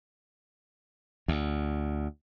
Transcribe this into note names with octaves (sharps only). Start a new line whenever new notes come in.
D2